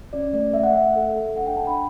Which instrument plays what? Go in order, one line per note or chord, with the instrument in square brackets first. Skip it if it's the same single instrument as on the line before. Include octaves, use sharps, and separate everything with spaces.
[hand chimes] C#4 D5
A3 D5
A3 E5
F#5
A3 E5
A4
A4
D4 F#5
G5
D4 A5
B5